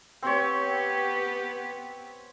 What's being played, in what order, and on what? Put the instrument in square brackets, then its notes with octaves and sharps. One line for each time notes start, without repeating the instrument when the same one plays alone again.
[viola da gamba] B3 G4 [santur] C4 C#5